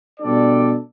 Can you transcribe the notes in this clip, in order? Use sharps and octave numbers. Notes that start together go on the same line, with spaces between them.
B2 G3 D4 A4 D5